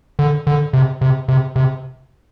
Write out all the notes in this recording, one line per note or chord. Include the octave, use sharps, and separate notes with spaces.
D3
D3
C3
C3
C3
C3